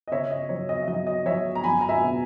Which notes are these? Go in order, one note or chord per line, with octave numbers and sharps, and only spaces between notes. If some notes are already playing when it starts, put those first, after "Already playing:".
D#5
C#3 C#5 E5
D#5
F#3 C#5
D#5
E5
F#3 D#5
D#5
F#3 C#5 E5
A#5
F#3 G#5 B5
A#5
E5 G#5
B2